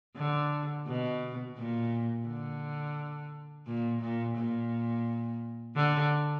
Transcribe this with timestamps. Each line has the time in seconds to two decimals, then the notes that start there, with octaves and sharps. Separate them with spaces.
0.17 D3
0.87 B2
1.56 A#2
2.27 D3
3.67 A#2
4.01 A#2
4.37 A#2
5.76 D3